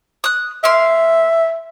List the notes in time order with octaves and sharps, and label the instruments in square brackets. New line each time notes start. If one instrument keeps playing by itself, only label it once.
[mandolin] D#6 F#6
[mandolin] A#3 F5 C6 [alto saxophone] E5